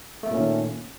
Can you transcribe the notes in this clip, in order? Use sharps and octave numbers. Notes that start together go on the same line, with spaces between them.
A#2 D#3 A3 A#3 C#4